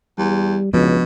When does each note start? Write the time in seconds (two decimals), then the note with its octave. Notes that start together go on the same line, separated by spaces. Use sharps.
0.18 E2 G3
0.73 C#2 B2 F3 B3 D4